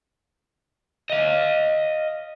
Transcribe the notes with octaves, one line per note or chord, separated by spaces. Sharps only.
D#5 F5